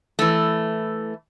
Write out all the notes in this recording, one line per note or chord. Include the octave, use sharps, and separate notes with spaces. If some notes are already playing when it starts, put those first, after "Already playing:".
E3 A3